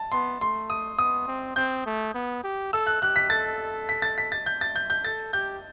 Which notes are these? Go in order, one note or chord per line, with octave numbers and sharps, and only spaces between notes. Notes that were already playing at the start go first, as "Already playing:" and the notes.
Already playing: A5
B3 C6
A3 C6
D#6
B3 D#6
C4
C4 G6
A3
B3
G4
A4 E6
F#6
G4 F#6
B6
A4 A6
B6
A6
B6
A6
G6
A6
G6
G6
A4 A6
G4 G6